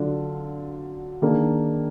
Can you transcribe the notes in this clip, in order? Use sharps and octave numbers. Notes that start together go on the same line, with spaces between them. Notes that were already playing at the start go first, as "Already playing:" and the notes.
Already playing: D3 F#3 D4 F4
D#3 A#3 D4 G#4